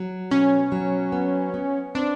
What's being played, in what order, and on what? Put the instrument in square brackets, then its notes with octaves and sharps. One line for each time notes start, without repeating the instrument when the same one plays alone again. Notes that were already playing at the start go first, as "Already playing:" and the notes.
Already playing: [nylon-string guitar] F#3
[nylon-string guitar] B2 [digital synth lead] C#4
[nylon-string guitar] F#3
B3
B3
[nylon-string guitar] C4 [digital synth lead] D4